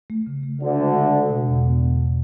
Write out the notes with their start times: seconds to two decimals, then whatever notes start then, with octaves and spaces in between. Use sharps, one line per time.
0.10 A3
0.27 C#3
0.43 A3
0.60 D2 D3 D4
0.78 G#3
0.95 F#4
1.13 F#4
1.29 B2
1.47 E2
1.64 B3